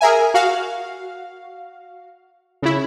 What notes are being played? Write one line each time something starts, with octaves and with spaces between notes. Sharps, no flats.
G#4 A#4 E5 G#5
F#4 F5
C#3 E4